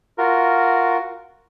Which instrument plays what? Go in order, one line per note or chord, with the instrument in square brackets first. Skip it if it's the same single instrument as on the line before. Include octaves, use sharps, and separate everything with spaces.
[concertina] F4 F#4 A#4